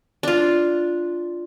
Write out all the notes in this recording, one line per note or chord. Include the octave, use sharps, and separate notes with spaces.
D4 F4